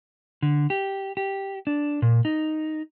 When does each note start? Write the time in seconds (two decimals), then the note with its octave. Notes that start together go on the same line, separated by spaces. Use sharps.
0.42 D3
0.70 G4
1.17 G4
1.67 D4
2.02 A#2
2.25 D#4